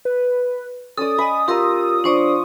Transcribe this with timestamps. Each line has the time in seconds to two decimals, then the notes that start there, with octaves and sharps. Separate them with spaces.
0.05 B4
0.97 C#4 A4 D5 D#6
1.18 D#5 G#5 B5
1.48 F4 G4 A#4 A#5 E6
2.04 F3 D4 C5 D5 C#6